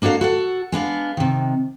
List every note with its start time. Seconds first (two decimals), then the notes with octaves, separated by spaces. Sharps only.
0.02 A#3 D4 F#4 A4 F5
0.21 F#4 A4 F#5
0.72 G#3 B3 D4 F5
1.17 C3 D#3